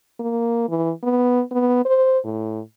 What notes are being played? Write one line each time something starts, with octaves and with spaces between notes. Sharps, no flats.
A#3
E3
B3
B3
C5
A2